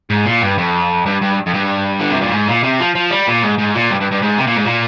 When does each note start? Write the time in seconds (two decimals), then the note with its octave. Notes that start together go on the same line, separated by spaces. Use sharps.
0.10 G#2
0.26 A#2
0.42 G2
0.58 F2
1.06 G2
1.21 G2
1.46 F2
1.54 G2
1.99 D3
2.10 C3
2.21 A#2
2.32 G#2
2.48 A#2
2.63 C3
2.80 F3
2.95 F3
3.11 G3
3.28 A#2
3.43 G#2
3.59 G#2
3.75 A#2
3.91 G2
4.01 G2
4.12 G2
4.22 G#2
4.38 C3
4.47 A#2
4.56 G#2
4.65 A#2